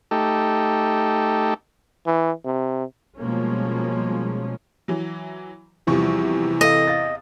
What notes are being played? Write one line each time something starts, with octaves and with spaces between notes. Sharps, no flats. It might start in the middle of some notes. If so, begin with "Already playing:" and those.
A3 D#4 G4 A4
E3
C3
B2 F3 G3 G#3 A#3 C#4
E3 F#3
E2 C3 E3 F3 G3 C#6
A4 D#5 F5
F5 A6